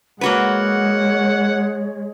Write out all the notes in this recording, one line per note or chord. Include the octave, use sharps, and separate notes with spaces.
G#3 A#3 F#4 B4 C#5 F#5